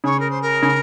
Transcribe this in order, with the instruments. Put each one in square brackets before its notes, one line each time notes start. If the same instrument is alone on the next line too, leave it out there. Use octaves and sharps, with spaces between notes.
[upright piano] C#3 [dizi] C#5
[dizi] A#4
C5
A#4
[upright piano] C#3